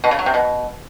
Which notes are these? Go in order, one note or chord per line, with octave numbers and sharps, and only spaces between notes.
B2
C#3
F#3
C3
B2